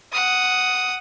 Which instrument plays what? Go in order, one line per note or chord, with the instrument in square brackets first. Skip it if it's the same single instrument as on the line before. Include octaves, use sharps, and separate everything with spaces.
[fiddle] F#5 D#6